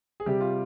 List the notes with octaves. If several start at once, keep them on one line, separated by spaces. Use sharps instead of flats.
G#4
C3 G3 G4
F4